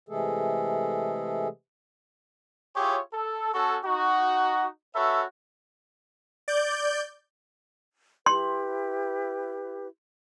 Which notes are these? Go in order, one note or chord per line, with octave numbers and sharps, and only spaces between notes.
C3 E3 G#3 A3 G#4 A4
E4 F4 G4 G#4 C#5
A4
C#4 F#4 A4
D#4 F#4
C#4 F#4 A4 B4 C#5 E5
D5 G6
E4 G4 B4 C6